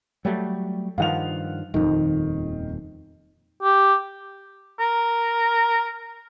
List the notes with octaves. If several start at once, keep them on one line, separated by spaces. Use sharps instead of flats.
F#3 G3 A3
G2 D#3 F3 F5 F#5 F7
D#1 F2 D#3
G4
A#4